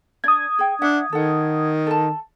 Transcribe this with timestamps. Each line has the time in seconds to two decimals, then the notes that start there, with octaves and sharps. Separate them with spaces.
0.24 D4 D5 D#6 G#6
0.59 G#4 G5
0.82 D4 E5 F#5
1.12 D#3 A4 F#5
1.87 A4 A5